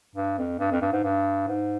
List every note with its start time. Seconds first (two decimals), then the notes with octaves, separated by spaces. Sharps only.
0.15 G2
0.38 F2
0.59 G2
0.71 F2
0.81 G2
0.92 G#2
1.04 G2
1.48 G#2